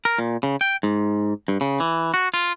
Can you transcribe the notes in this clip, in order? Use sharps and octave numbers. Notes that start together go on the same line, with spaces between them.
A#4
A#2
C#3
G5
G#2
G2
C#3
E3
F#4
F4